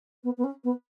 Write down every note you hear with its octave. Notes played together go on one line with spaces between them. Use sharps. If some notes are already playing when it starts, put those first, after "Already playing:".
B3
B3
C#4
B3